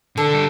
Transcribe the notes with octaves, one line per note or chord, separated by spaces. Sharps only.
D3 A4
G3